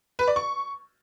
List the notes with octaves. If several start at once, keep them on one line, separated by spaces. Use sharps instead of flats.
B4
D5
C#6